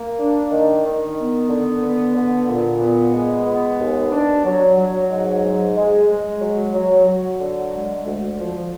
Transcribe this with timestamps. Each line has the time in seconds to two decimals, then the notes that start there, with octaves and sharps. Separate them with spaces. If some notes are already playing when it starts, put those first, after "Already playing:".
Already playing: A#3
0.18 D4
0.51 D#3
0.84 D#3
1.17 B3
1.49 D3
1.82 B3
2.15 D3
2.48 A#2
2.80 B3
3.14 G#3
3.46 B3
3.79 D#2
4.12 D4
4.45 F#3
4.77 F#3
5.10 G#2
5.43 G#2
5.76 G#3
6.09 G#3
6.41 F#3
6.74 F#3
7.07 F#3
7.40 D3
7.73 G#3
8.05 D2
8.38 F3